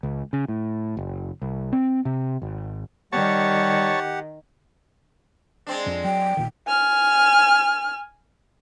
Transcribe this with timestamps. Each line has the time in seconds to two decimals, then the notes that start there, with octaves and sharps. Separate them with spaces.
0.03 C#2
0.33 C#3
0.48 A2
0.97 F#1
1.42 C2
1.73 C4
2.05 C3
2.42 G#1
3.13 D#3 G3 G4 C#5 F#5 A5
5.67 G#3 C4 D4
5.87 F2
6.04 F#3 G5
6.37 A#1 A#2 D#3
6.68 G#5 F6